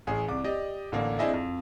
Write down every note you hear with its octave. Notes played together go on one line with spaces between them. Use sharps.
A1 G#4
C2 D6
G4 D5 D#5
A1 D3 A#3
C4 D4 E4 G#4 D#5 E5
F2